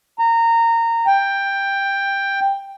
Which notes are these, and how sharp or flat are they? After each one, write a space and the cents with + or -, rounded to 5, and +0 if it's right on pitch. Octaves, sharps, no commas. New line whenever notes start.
A#5 -20
G5 +10